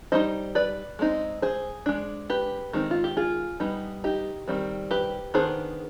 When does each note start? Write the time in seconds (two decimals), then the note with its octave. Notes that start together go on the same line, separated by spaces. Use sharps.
0.12 G3 C4 D#4 C5 D#5
0.55 B4 D5
0.99 G#3 C4 D#4
1.42 G#4 C5
1.86 G#3 D4
2.30 G4 B4
2.73 D#3 G#3 C4 D#4
2.91 F4
3.04 G4
3.17 F4 G#4
3.60 G3 B3 D#4
4.04 D#4 G4
4.48 D#3 G3 C4
4.91 G4 B4
5.34 D#3 B3 D4 G#4 C5